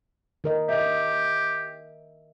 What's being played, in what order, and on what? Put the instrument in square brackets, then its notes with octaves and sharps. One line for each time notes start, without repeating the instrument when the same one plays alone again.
[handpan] D#3 A#4 D#5
[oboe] G4 [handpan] D#5 E5